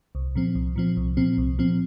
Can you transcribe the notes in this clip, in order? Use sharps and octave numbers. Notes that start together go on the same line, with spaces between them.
C2
A#2 F3 C4
C2
A#2 F3 C4
C2
A#2 F3 C4
C2
A#2 F3 C4